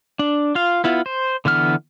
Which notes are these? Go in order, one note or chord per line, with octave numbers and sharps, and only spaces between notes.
D4
F4 F5
B3 E4 F4
C5
D3 E3 B3 F6